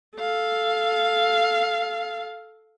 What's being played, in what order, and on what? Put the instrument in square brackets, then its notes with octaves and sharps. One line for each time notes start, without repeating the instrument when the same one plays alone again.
[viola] A4 F5